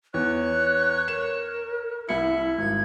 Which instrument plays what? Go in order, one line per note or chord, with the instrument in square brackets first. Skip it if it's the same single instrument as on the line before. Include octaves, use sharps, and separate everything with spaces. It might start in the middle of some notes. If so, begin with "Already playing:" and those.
[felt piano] E2 [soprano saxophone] C#5 [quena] F#6
[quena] A#4 [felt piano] E7
[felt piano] C2 C#7 [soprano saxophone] E4
[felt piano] G#1 [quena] G#6